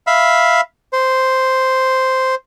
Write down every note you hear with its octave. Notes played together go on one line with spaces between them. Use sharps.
E5 F5 B5
C5